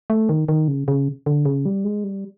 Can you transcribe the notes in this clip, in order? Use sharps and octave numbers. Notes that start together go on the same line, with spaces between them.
A3
D#3
D#3
C#3
C#3
D3
C#3
G3
G#3
G3